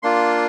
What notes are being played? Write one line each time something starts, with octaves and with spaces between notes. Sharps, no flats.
A#3 D4 F4 C6